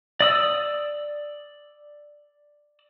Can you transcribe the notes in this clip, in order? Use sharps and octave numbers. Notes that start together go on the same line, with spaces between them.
D5 D#6 E6